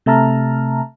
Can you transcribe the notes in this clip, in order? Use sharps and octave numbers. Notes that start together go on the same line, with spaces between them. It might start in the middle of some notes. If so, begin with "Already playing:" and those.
C3 A3 E5 A5 A#5 F6